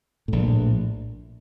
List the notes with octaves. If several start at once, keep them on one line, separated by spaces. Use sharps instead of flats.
A#1 A2